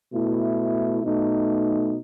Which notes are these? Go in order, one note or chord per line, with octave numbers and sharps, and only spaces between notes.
B2 A3 E4
B2 A3 D#4